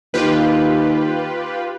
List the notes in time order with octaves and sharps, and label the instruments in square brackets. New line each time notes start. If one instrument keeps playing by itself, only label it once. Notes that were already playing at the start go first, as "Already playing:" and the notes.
[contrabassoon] D#2 [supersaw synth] F4 G4 B4